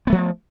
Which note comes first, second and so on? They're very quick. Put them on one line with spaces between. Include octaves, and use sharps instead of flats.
B3 A3 F3